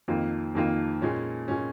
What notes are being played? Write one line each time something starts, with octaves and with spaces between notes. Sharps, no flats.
F2 D#3 A#3 F4
F2 D#3 A#3 F4
A#2 G#3 C#4
A#2 G#3 C#4